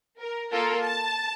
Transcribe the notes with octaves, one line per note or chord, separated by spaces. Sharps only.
A#4
A#3 F4 A4 A#4
A5